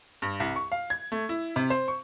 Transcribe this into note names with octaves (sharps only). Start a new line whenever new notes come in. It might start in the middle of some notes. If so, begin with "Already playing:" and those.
G2
C2
C#6
F5
G#6
A3
E4
C3
C5
C#6